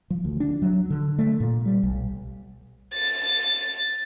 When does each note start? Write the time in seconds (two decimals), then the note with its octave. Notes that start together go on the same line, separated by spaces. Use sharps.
0.10 F3
0.25 D2
0.40 D4
0.62 F#3
0.90 D3
1.19 A3
1.40 A#2
1.66 G3
1.83 B1
2.94 A6